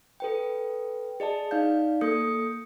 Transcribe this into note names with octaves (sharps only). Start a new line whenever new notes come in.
A4 B4 G5
G#4 D5 D#5 A5
D#4 D5 F5 G6
A#3 A4 D#6 G6 C#7